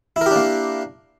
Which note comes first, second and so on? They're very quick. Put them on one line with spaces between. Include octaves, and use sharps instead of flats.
E4 A#4 G4 D4 A#3